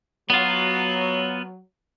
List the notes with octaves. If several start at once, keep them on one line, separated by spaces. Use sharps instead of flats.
F#3 B3 F4